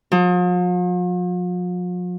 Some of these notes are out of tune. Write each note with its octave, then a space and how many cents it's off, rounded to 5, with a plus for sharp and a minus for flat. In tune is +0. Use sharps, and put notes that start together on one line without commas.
F3 +45